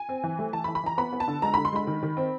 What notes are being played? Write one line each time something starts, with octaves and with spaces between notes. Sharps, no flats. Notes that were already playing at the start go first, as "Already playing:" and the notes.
Already playing: G#5
C4
E3
A3
E3 A5
B5
E3
B5
E3 A#5
B3 B5
B3
A5
D3
G#3 A#5
D3 B5
C6
G#3 B5
D#3
D#3
C4